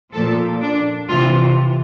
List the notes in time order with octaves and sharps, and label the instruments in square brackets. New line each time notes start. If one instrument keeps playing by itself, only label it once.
[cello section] A#2 F3 A4
D4
C3 E3 F4